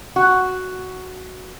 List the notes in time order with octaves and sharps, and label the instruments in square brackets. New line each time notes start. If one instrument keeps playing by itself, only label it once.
[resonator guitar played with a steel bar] F#4